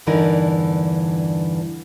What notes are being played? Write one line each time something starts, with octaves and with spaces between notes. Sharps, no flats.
E2 G2 D3 E3 D#4 A#4